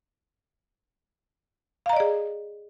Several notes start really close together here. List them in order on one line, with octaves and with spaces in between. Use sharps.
F5 A#5 D#5 D5 G#4